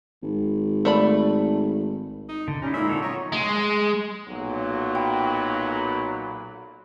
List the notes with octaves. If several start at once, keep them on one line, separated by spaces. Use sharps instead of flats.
G#1
A3 D5 B5
D#4
D3
G3 C#4 D#4 E4
A#2 G#3 D#4 E4 E5
D3 C4 A4 C#5
F#3 C#5 D#5 A#5
G#3
B1 A#2 F#3
G5 B5